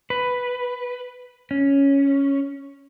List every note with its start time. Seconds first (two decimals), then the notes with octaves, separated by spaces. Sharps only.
0.10 B4
1.51 C#4